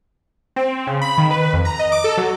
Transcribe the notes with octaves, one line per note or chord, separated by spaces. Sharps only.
C4
C#3
B5
D#3
B4
F2
A#5
D#5
D6
A4
F#3